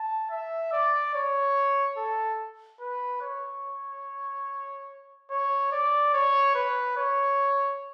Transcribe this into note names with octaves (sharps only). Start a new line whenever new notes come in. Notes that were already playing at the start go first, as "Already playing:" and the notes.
Already playing: A5
E5
D5
C#5
A4
B4
C#5
C#5
D5
C#5
B4
C#5